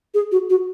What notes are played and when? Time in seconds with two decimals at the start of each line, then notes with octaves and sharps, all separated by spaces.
0.14 G#4
0.32 F#4
0.50 F#4